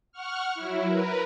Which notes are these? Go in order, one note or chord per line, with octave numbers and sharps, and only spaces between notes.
F#5 C#6 F6
F#3 E4
A#4 B4